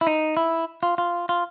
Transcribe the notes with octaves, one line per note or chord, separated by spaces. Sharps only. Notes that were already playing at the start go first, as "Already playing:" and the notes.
E4
D#4
E4
F4
F4
F4